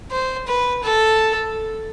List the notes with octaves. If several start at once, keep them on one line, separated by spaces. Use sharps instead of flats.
C5
B4
A4